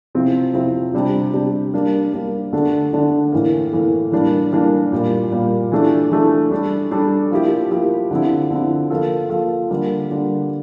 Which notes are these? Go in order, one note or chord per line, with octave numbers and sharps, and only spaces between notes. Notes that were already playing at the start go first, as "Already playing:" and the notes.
C3 F3 C4 E4
C3 F3 C4 E4
C3 G3 D4 G4
C3 G3 D4 G4
G3 A#3 D4
G3 A#3 D4
D3 A3 D4
D3 A3 D4
A2 E3 A#3
A2 E3 A#3
E3 G3 A#3 D4
E3 G3 A#3 D4
A#2 G3 A#3
A#2 G3 A#3
E3 A3 D4
E3 A3 D4
G3 D4 A4
G3 D4 A4
F3 A#3 E4 G4
F3 A#3 E4 G4
D3 F3 C4 E4
D3 F3 C4 E4
F3 A#3 F4 A4
F3 A#3 F4 A4
D3 G3 A#3
D3 G3 A#3